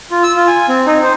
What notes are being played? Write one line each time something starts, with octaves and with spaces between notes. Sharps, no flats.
F4
E6
F4
G#5
C4
D#4
C5